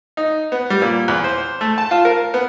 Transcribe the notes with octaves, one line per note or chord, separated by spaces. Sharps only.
D#4
B3
G3
A#2
E2
C5
A3
A5
F4
A#4
B3